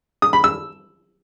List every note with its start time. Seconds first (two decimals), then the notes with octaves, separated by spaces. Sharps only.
0.22 D#6
0.33 B5
0.44 E6